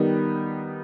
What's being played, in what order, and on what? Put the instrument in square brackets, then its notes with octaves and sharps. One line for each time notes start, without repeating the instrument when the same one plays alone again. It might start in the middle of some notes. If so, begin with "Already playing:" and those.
Already playing: [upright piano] D#3 G3 B3 D#4